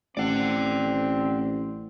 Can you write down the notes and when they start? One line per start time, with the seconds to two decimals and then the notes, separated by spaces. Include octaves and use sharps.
0.17 A1 C4 D5 F#5